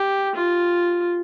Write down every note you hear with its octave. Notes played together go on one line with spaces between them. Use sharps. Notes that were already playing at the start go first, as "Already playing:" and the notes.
Already playing: G4
F4